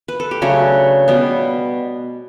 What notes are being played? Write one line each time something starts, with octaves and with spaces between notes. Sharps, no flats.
B4
A4
G4
C#3 F#3 A3 D4 F#4
B2 G3 B3